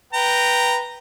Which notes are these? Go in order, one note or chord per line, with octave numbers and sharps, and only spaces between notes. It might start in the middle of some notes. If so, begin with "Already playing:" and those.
B4 G5 A#5